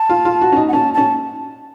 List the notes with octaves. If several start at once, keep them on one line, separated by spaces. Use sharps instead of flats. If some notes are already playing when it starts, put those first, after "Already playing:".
Already playing: A5
F4
F4
F#4
C#4
D#4
F#5
C#4 A5
C#4 A5